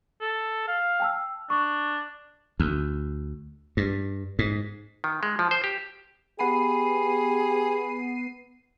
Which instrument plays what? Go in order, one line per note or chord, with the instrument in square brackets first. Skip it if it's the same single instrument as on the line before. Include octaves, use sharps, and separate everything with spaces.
[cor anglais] A4
F5
[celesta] G5 A5 E6
[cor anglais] D4 [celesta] C#6
[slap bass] D2
G2
G#2
[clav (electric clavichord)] D#3
G#3
F3
C5
G4
[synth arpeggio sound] B3 C7 D#7 [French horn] G4 [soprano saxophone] G#4 [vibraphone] B5